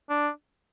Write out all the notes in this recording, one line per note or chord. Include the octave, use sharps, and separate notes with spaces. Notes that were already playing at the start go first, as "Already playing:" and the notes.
D4